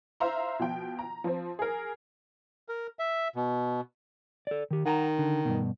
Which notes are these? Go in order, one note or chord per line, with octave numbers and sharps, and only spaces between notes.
C5 E5 F5 A#5 C6
B2 F3 G5
A#5
F3 C4
G#4 A#4
A#4
E5
B2
A4 D5
D#3 G4
D#3 F#5 G#5 A#5
D3
G2 B2